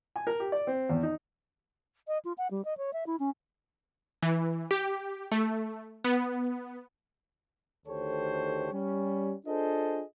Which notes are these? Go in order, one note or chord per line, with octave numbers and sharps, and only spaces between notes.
G#5
A#4
G4
D5
C4
E2
D#4
D#5
F4
F#5
G3
D#5
C#5
E5
E4
C#4
E3
G4
A3
B3
D2 D#3 G4 A4 C5 C#5
G3 C#4
D4 F4 G#4 A4 C5 D#5